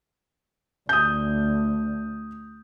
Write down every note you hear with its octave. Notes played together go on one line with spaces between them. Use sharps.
D2 D#6 G6